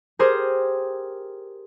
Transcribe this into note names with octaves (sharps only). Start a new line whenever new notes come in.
G4 G#4 A#4 C5